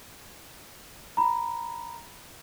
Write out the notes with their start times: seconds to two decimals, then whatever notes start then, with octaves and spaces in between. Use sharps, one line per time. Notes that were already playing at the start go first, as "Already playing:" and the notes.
1.17 A#5 B5